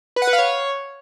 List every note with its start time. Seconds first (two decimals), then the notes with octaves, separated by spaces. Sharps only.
0.16 B4
0.22 F#5
0.27 B4
0.33 F5
0.38 C#5